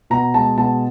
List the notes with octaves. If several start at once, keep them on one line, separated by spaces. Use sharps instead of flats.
B2 A#5
G#3 A5
B2 A5